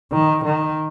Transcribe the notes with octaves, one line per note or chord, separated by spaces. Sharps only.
D#3
D#3